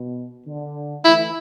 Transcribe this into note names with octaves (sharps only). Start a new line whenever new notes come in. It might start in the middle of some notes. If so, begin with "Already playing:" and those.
Already playing: B2
D3
E3 A3 E4